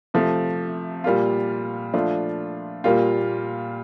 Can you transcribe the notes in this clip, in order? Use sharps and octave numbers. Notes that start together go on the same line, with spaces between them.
C3 F3 A3
A#2 G3 A#3 F4
F3 A3 D4 F4
A#2 G3 A#3 F4